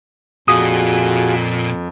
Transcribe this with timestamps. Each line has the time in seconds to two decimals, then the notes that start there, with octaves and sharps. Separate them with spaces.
0.48 F2 A#2 F4 F#4 G#4 D#6